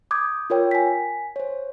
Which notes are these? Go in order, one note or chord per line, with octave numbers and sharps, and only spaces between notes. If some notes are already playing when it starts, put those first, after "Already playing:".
D6 D#6 G6 G#6
F4 A#4 C#5 G5
G#5 B6
C5 C#5